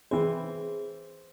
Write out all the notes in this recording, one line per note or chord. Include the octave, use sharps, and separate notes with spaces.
E3 C4 G#4 C5